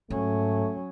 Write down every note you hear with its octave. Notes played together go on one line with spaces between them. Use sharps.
G#2 F#3 A3 C#4